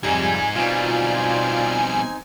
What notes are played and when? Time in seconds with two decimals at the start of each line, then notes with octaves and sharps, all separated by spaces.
0.03 F2 G#2 C3 G3 D#4 G#5
0.56 B2 G3 C4 D#4 F4 D5